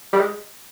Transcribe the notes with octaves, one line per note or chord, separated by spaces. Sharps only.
G3
G#3